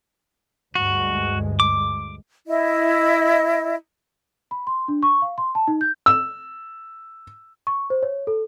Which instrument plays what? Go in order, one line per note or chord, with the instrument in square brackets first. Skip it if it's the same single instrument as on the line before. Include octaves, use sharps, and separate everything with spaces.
[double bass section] D2 G2 G#3 [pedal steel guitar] F#4
[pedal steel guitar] D6
[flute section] E4 D#5
[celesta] B5
C6
D4
C#6
F5
C6
A5
D#4
G6
[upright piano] E6
[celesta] C#6
C5
C#5
A4